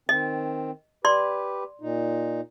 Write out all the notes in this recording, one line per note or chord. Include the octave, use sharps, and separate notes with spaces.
D#3 C4 D#5
G4 B4 D5 C6
A#2 D#4